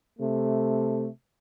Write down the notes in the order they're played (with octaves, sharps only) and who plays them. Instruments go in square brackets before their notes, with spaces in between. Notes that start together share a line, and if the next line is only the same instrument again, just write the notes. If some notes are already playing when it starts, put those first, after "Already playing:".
[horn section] C3 A3